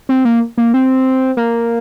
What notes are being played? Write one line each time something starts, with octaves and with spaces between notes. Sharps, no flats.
C4
A#3
A#3
C4
A#3